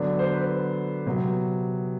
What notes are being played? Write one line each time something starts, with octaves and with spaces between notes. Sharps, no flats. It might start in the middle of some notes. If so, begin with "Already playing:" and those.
Already playing: D3 F#3 B3 D4
C5
B4
C3 F#3 B3